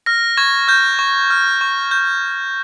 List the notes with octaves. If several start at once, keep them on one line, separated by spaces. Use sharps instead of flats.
F6 A#6
C#6 G#6
F6 G6
C#6
F6
C#6
G6